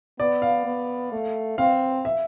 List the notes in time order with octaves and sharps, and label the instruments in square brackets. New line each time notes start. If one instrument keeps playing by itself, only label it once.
[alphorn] B3 [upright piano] D5
[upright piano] F5
[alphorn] B3
A3
[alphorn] C4 [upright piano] F5
[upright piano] E5